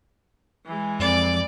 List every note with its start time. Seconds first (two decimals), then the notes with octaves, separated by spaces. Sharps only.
0.66 E3 G#3
1.00 F2 D5